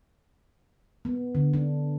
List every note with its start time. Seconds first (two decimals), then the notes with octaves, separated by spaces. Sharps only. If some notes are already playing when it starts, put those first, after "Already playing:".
1.05 B3
1.35 D3
1.53 D4